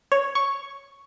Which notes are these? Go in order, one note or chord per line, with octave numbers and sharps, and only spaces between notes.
C#5
C#6